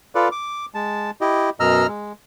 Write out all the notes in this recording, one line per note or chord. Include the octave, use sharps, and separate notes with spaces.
F4 A4 B4 D5
D6
G#3 A5
E4 G4 D#5
F#2 B2 D#5 A#5 E6 F6
G#3